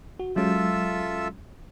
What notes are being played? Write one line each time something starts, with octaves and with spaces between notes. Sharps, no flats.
F#4
F#3 G#3 C#4 F4 A4 E5